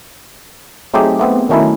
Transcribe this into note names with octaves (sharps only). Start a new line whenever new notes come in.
F#3 A3 C4 D#4 G4 G#4
A3 B3 C4
D#3 F#3 A3 C#4 D#4 E4